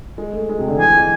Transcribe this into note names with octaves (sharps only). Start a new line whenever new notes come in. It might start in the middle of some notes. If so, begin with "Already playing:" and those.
G#3
A3
G#3
C3
D3
E3 G#5
G#3